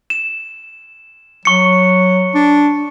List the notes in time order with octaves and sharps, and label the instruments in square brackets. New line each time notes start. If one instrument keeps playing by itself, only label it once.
[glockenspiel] E7
[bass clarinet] F#3 [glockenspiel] C#6 C#7
[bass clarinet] D4